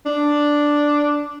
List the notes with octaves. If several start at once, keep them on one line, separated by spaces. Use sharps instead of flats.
D4